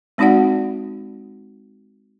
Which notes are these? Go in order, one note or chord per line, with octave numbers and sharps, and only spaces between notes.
G#3 C4 D#4 F#4 D5 F#5